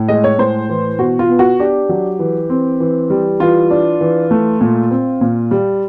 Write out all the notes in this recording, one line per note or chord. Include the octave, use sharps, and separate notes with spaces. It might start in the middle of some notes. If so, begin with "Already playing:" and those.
Already playing: A2
G#3 D#5
C#5
A2 C5
E3
B2 F#4
F4
B3
F#4
D4 G4
F#3
E3
C4
E3
G3
E3 F4
D4
E3
A3
A#2
C4
A#2
G3